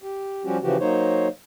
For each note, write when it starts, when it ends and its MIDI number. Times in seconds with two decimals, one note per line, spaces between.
0.02 0.44 67
0.45 0.58 53
0.45 0.58 55
0.45 0.58 61
0.45 0.58 66
0.45 0.58 67
0.63 0.77 49
0.63 0.77 52
0.63 0.77 53
0.63 0.77 66
0.63 0.77 67
0.80 1.28 54
0.80 1.28 58
0.80 1.28 63
0.80 1.28 72
0.80 1.28 73